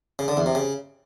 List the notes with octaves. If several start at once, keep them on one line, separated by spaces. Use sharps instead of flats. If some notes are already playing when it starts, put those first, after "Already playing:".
C#3
D3
E2
C3
C#3